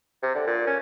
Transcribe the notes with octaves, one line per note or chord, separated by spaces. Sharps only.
C3
D3
A#2
C#4